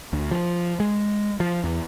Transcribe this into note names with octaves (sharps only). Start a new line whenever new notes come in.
D2
F3
G#3
F3
E2